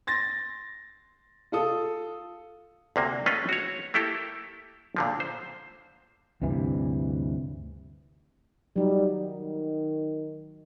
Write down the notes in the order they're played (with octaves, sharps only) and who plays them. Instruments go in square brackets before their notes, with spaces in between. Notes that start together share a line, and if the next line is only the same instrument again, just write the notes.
[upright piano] C6 A6 A#6
F4 A4 D#6
[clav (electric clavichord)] D2 C3 A#3
G#3 A3 C#4 F4 B4 D#5
F#4 C#5
A3 A#3 E4 G4 A4
A#2 D3 F3
C5
[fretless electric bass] D2 G2 C3 E3
[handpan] F#3 D#4 [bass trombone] G3
[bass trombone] D#3